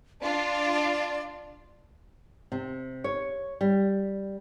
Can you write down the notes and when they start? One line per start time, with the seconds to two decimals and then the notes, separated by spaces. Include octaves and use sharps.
0.21 D4 F4 D5
2.52 C3
3.04 C#5
3.61 G3